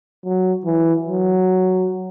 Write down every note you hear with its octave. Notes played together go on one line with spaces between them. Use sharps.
F#3
E3
F#3